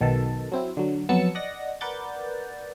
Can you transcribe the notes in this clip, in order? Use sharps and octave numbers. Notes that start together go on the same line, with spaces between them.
B1 B2 D#3 A4 A5
F#3 C4 E4
D3 F#3
F2 F#3 B3 A5 E6 C#7
D5 D#5 F#5 A#6
A#4 B4 D5 F#5 G6 A6